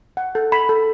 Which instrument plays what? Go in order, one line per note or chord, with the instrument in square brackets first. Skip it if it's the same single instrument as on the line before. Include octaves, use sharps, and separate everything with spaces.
[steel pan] F#5
A4
B5
A4